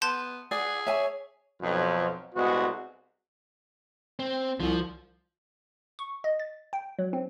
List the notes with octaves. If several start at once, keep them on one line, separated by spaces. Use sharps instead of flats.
B3 A5 C6 G6
G#4 D5 F#5
C#5 E5 G#5
B1 F2
C2 G#3 B3 F#4
C4
C2 F3
C#6
D#5
A6
G5
F#3
C4